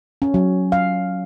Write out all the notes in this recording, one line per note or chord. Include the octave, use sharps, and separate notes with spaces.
C#4
F#3
F5